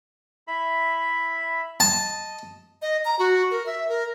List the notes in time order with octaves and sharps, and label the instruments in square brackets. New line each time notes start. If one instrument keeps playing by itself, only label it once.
[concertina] E4 E5 B5
[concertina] D#5 D#6 [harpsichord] A5
[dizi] D#5
A#5
F#4
A#4
E5
A#4